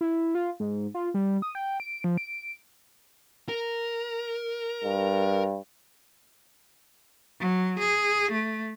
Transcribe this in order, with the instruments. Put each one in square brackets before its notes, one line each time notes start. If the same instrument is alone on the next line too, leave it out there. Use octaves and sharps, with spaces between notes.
[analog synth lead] E4
F4
G#2
F4
G3
D#6
G5
D7
F3
D7
[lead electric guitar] A#4
[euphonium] G2
[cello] F#3
G#4
A3